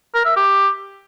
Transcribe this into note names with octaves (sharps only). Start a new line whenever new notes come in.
A#4
E5
G4